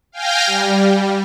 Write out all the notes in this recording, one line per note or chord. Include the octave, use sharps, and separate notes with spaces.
F5 G5 G#5 F6 G6 A#6
G3